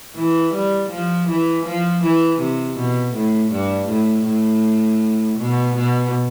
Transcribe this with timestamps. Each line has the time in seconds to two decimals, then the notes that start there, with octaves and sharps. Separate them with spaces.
0.16 E3
0.53 G3
0.90 F3
1.28 E3
1.66 F3
2.03 E3
2.39 C3
2.76 B2
3.14 A2
3.51 G2
3.88 A2
4.26 A2
5.38 B2
5.75 B2